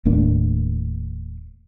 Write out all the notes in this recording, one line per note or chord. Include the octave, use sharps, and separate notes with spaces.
D#1 A2 A#3 D4